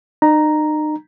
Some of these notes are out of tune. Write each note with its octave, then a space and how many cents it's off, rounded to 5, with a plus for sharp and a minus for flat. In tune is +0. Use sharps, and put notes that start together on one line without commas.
D#4 -40 A#5 +0